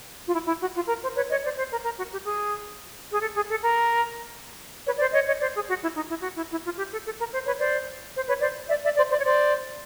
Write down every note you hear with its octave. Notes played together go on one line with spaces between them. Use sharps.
F4
E4
E4
F#4
F4
A#4
C5
B4 C#5
C#5 D#5
C5 D5
C5
A#4
A#4
F#4
G4
G#4
G#4
A4
G#4
A4
A#4
B4 C#5
C5 D5
C#5 D#5
C#5 D#5
C5 D5
G#4
F#4
E4
D#4
E4
F#4
E4
E4
F4
G4
A4
A4
A#4
C5
B4 C#5
C5 D5
C5
B4 C#5
C5 D5
D5 E5
D5 E5
C5 D5
C5 D5
C#5
C5 D5